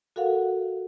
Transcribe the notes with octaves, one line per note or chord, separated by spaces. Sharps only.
F#4 A4 A#4 F5 F#5